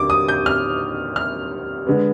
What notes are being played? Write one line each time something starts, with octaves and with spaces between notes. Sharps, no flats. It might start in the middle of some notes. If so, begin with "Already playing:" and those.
Already playing: D#2 D3 D6
D#6
G6
F6
F6
D3 G#3 B3